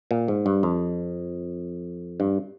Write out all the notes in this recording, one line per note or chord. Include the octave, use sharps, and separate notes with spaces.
A#2
G#2
G2
F2
G2